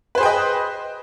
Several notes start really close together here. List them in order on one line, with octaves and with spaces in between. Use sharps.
B4 C5 G#4 G5 D#5